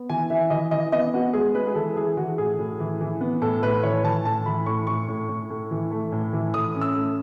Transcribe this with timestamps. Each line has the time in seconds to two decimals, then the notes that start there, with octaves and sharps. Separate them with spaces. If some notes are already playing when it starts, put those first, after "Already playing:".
Already playing: B3
0.09 E3 G#5
0.30 E3 E5
0.50 E3 D#5
0.71 E3 D#5
0.92 B3 D#5
1.14 B3 F#4
1.33 G#3 G#4
1.55 G#3 B4
1.67 G#4
1.75 E3 A4
1.97 E3 G#4
2.17 E3 F#4
2.38 A2 G#4
2.59 A2
2.80 E3
3.01 E3
3.21 B3
3.42 A2 A4
3.63 A2 B4
3.83 E3 C#5
4.04 E3 A5
4.25 A2 A5
4.46 E3 B5
4.66 A2 C#6
4.87 A2 C#6
5.08 A2
5.29 A2
5.50 A2
5.71 E3
5.91 A3
6.12 A2
6.33 E3
6.54 A2 D#6
6.75 C#4
6.81 E6
6.95 A3